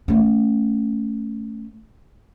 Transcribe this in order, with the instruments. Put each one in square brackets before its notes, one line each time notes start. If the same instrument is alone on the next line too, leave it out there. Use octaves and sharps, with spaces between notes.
[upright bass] A3 C#4